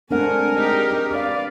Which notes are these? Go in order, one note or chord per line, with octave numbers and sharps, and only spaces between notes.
G#3 A3 C4 D4 A#4 F#5 G#5
G#3 D#4 G4
D4 B4 D5 F5